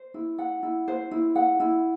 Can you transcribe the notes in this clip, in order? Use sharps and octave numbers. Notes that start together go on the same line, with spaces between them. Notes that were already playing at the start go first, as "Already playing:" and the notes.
Already playing: C5
E4
F#5
E4
C5
E4
F#5
E4